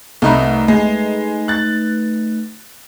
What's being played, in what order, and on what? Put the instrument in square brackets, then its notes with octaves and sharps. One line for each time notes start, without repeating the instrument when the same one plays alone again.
[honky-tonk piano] C2 [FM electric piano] A3 D#4 B4
[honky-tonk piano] G#3
F#6 A6